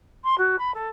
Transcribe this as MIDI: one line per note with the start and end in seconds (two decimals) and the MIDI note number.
0.24 0.35 84
0.38 0.56 66
0.58 0.72 83
0.74 0.88 69